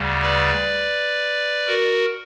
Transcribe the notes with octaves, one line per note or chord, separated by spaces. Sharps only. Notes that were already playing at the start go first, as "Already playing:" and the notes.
Already playing: D2 C#3 G3
B4 D5
F#4 A#4